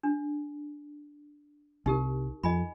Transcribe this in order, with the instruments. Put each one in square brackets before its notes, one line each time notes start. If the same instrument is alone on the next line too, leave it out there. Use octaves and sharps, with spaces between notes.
[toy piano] D4
[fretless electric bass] C2 [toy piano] D#4 G4 A#4
[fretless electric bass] F2 [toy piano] D#5 G#5 B5